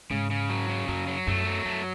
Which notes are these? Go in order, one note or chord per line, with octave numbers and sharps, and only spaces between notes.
G#2 C#3
C#3
F#3
C#3
F#2 F#3
F#3
F#2 A3
F#3
F#2 A3